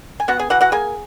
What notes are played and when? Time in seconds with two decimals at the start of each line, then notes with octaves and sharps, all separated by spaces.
0.20 G#5
0.28 B3 F#4 F#5
0.39 G#4 G#5
0.50 E3 F#4 F#5
0.61 F#4 F#5
0.72 A#3 G#4 G#5